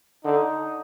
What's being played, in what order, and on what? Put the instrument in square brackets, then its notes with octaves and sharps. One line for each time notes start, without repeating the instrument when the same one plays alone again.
[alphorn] D3 [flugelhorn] D#4